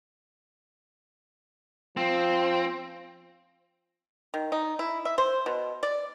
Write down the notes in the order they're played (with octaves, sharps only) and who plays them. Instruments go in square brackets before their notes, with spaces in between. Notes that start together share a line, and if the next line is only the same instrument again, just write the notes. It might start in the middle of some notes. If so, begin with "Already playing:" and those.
[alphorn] F3 [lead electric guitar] C4
[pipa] D#3
D#4
E4
E5
C5
B2
D5